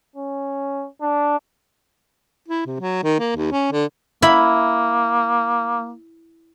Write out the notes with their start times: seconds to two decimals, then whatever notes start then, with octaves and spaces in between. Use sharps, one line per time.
0.16 C#4
1.01 D4
2.48 E4
2.67 C3
2.80 F#3
3.03 D#3
3.19 A#3
3.36 D#2
3.51 C#4
3.72 D3
4.22 A#3 E4 B5